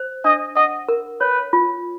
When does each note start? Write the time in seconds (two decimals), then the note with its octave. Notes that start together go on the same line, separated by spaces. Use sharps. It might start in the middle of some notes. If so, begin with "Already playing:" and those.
Already playing: C5
0.25 D4 D#5
0.56 D#5 F#5
0.89 A#4
1.20 B4 C#5
1.53 F4